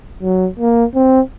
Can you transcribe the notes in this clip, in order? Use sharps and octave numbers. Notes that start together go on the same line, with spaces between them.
F#3
A#3
C4